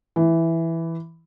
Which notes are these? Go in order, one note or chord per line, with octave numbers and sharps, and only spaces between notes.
E3